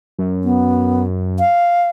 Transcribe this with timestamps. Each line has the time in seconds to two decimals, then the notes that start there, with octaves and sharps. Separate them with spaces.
0.18 F#2
0.44 B3
1.39 F5